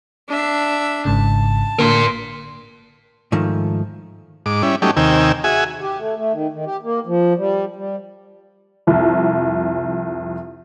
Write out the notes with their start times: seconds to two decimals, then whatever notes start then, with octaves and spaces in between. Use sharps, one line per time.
0.29 D4 E5
1.05 G#1 G#2 C#3 A5
1.79 D3 A#3 A#4 C6
3.32 G#2 D#3 F3 A3
4.46 G#2 D6
4.63 G3 C#4 E4
4.82 F#3 G3 A3 C#4 D#4 G4
4.97 D#2 C3 D#3 G5 G#5 E6
5.44 F#4 G#4 E5 G#5
5.82 G4
5.98 A3
6.16 A3
6.33 D#3
6.51 D#3
6.66 G4
6.83 A#3
7.07 F3
7.37 G3
7.76 G3
8.87 C2 F2